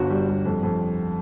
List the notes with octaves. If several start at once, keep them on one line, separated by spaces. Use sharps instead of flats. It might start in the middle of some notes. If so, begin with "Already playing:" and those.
Already playing: G1 F#4
G3
G3
F2
F2